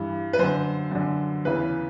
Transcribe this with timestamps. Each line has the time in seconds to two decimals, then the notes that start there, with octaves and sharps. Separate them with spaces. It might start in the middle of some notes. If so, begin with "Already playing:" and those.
Already playing: G2 E3
0.33 B4
0.39 F#2 D3 C5
0.91 F#2 D3
1.45 E2 C#3 E3 B4